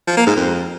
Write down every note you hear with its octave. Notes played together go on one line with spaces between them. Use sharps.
F3
A#3
G#2
F2